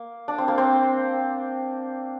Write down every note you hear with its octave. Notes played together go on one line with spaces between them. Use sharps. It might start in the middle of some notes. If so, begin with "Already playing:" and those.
Already playing: A#3
D4
C4
A#3
C4